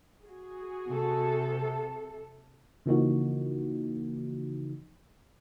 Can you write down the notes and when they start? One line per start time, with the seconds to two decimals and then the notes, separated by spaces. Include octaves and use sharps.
0.23 F#4 G#4
0.87 C3 A4
2.86 C#3 E3 F3 A#3 D#4 F#4